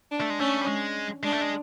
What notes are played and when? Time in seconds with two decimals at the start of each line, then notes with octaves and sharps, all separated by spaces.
0.11 D4
0.21 A3
0.30 G#3
0.39 A3 C#4
0.61 G3
0.67 G#3
1.23 G#3 D4
1.32 A3
1.41 G#3